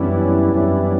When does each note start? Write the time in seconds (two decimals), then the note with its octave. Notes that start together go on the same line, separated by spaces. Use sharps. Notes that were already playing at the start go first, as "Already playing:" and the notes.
Already playing: F#2 E3 G3 B3 C#4 D4 E4
0.54 F#2 E3 G3 B3 D4